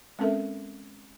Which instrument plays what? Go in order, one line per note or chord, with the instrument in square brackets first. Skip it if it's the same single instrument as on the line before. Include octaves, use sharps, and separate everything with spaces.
[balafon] G#3 C4 C#4 A4 A#4 E5